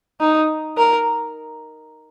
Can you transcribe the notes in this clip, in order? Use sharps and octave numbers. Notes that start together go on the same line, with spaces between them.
D#4
A#4